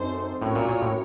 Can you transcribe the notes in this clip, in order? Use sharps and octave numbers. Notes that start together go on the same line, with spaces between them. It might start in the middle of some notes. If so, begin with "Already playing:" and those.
Already playing: F#2 C4 D#4 A4 C5
A2 C#4 F#4 A#4 C#5
A#2
A#2
A2